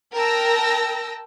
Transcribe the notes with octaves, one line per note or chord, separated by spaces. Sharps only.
A#4 G5 A5 E6 A#6